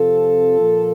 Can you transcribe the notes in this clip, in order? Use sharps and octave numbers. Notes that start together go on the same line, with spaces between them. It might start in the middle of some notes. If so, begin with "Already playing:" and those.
Already playing: F2 C3 F3 F4 A4
A#2 F3 A#3